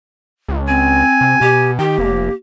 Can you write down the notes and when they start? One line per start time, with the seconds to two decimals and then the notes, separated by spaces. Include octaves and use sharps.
0.49 C#2
0.68 C4 G#5
1.21 C3
1.41 B2 G4
1.79 D#3 G4 G5
1.98 F1 A#3